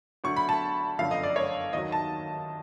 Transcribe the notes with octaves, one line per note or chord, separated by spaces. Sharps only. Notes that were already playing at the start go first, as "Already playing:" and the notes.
D2 D3 F#3 C#6
B5
A5
G1 F#2 D3 F3 F5
D#5
D5
C#5
D#2 D#3 F#3 D#5
A5